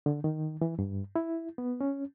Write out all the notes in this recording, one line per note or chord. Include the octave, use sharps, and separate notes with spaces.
D3
D#3
E3
G2
E4
B3
C#4